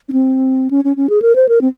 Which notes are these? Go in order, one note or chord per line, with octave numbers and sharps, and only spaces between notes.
C#4
C4
C#4
C#4
C#4
G#4
A#4
C5
A#4
C4